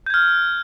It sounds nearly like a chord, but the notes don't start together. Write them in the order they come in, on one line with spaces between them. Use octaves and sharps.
G6 G#6 F6